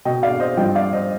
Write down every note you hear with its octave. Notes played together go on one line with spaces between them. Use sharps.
B2 D#5 G5
D5 F5
C5 D#5
G2 F3 D#5 G5
D5 F5
C5 D#5